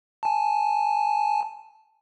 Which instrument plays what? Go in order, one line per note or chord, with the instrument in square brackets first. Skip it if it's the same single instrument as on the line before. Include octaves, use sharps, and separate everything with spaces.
[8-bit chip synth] G#5 A5